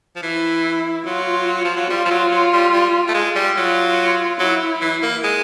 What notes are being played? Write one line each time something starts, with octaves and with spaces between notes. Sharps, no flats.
F3
E3 E4
F#3 F4
F3
F#3
G3 F4
F3
F#3
F#3
G3
G3
A3
G#3
G3
F#3 F4
F#3 E4
E3
A#3
G#3